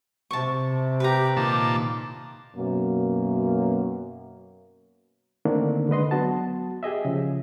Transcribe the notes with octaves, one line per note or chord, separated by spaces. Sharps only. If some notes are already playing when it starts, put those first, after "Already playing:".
C3 A5 C#6
G4 B4 A#5
A#2 D#3 A5 D6
F#2 B2 A#3
D3 D#3 A3 A#3 C4 D4
D3 G#3 B4 D#5 C6
F#3 B3 F#4 A5
G4 G#4 D#5 E5
C#3 F3